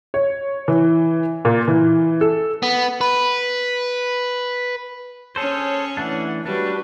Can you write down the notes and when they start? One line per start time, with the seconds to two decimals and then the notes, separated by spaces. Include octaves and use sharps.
0.14 C#5
0.68 E3
1.45 A#2
1.68 E3
2.21 A4
2.63 B3
3.01 B4
5.36 C#4 G#4 A4 C5 C#5
5.97 E3 A3 D4 F#5
6.45 G3 D4 F#4 B4